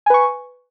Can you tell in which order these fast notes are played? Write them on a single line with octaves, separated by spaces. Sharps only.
G#5 B4 C#6